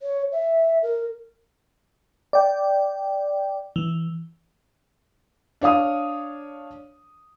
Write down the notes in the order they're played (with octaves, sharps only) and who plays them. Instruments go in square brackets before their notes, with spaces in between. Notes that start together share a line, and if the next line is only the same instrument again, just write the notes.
[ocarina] C#5
E5
A#4
[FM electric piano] D5 G5
E3
[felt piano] D4 C#5 F5 D#6